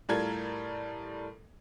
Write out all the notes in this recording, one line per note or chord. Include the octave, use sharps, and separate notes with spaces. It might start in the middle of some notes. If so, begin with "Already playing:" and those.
A2 G3 F4 A4 A#4 G#6